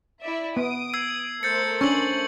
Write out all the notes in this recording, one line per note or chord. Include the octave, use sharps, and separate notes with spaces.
E4 D5 E5
B3 D#6 D7
E6 G#6 C7
A3 A#4 C5 G6 A6 C#7
C#4 D4 C#6 E6 F#7